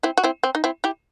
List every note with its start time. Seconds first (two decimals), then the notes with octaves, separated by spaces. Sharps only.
0.03 C4 E4
0.18 F#4
0.24 C4 E4
0.43 C4
0.55 D#4
0.64 C4 E4
0.84 E4 G4